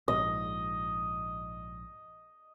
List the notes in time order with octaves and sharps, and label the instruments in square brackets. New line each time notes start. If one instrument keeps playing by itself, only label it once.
[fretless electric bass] A#1 G#2 [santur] D#5